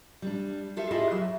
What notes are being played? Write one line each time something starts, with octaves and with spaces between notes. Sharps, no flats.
G3 D4
F4 G4 A4 E5 F5
E4 F4 G4 G#4 D#5 E5
F#3